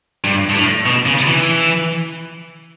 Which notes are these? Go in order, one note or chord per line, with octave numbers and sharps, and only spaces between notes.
G2
G2
A2
B2
C#3
E3